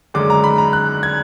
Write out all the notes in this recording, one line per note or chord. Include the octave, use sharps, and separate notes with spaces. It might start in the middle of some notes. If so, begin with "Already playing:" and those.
F#2 D3 G#3 D6
A#5
B5
A#5
F#6
G#6